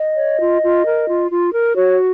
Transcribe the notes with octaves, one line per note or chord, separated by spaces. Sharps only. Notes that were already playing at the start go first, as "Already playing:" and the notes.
Already playing: D#5
C#5
F4
F4
A#4
F4
F4
A#4
F#4 C#5